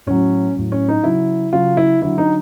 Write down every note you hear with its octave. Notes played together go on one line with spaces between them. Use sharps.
A2 F#3 C#4
A2 F#3
C#4
D#4
C#3 F#3 E4
C#3 F#3 F4
E4
D3 F#3 E4
D#4